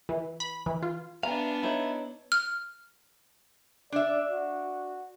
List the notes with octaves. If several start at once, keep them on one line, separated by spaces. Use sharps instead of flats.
E3
B5
E3
F4
B3 D4 B4 E5 F5 G#5 A#5
D#4 E4 C#5 A#5
F6
D4 D5 E5
F#4